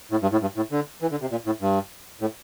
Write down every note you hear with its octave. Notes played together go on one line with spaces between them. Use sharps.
A2
G2
A2
G2
A2
D3
E3
D3
C3
A#2
A2
G2
A2